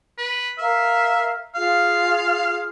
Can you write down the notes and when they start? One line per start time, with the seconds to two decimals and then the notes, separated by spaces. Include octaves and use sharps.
0.18 B4
0.58 A#4 E5 F5 F6
1.55 F4 G#4 F5